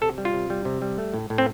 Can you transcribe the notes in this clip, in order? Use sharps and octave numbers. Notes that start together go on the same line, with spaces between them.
C3 A4
G3
F4
C3
G3
C3
G3
A3
A2
A2
C4